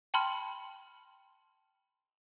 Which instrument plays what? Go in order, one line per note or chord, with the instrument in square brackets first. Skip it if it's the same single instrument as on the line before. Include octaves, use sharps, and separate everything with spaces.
[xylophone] G5 A5 B5 C6 F6